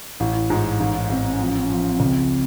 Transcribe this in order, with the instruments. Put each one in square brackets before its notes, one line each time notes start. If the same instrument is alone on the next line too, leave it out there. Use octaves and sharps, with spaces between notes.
[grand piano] A1 [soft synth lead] E4
[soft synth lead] E4
[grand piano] G#2 [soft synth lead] F4
[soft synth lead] E4
[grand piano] A1 [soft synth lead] D#4
[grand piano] A1 [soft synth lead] C4
[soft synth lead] C4
C#4
[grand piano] F3 [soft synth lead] C4
[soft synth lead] C#4
C4
C#4
[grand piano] F3 [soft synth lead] C4
[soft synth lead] C#4
C4
[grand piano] C#2 [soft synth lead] C#4
[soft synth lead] C4